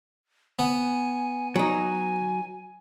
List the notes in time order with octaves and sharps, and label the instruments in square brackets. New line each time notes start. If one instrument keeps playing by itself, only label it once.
[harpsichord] B3 [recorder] G#5
[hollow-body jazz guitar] F#3 D#4 [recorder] G#5